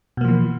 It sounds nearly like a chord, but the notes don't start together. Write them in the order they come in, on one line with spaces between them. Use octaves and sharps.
B2 A#3 F3 E3